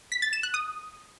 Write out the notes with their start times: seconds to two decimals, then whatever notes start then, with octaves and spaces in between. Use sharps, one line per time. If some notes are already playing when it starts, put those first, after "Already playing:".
0.12 B6
0.22 A6
0.33 E7
0.43 F#6
0.54 D#6